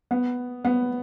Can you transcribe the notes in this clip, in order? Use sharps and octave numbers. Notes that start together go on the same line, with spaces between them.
B3
B3